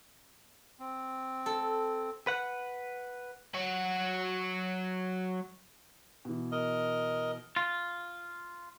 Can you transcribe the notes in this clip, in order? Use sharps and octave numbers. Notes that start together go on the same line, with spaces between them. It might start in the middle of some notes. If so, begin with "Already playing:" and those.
C4
A4
B4 F#5
F#3 F#4
B2 E3
A#4 D#5
F4